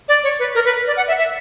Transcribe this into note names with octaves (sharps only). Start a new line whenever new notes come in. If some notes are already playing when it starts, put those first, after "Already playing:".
D5
C#5
B4
A#4
B4
D5
F#5
E5
E5